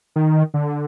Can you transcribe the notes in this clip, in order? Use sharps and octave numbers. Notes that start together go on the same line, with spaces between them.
D#3
D3